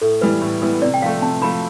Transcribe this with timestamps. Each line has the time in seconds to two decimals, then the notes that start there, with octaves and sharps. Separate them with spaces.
0.02 A2 A4
0.21 E3 G3 B3 E4 B4
0.41 A2
0.62 E3 G3 B3 E4
0.82 C3 D5
0.94 G5
1.02 F3 A3 F5
1.22 C3 A5
1.42 F3 A3 B5